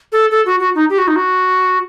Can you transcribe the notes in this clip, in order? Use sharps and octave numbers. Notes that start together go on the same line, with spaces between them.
A4
A4
F#4
F#4
D#4
G4
F#4
D#4
F#4